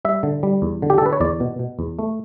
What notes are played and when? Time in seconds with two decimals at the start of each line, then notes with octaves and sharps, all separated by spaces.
0.05 G3 E5
0.23 D3
0.43 G3
0.62 E2
0.82 D3
0.90 G4
0.98 A4
1.02 D3 B4
1.13 C#5
1.20 E2 D5
1.40 B2
1.59 B2
1.79 E2
1.99 A3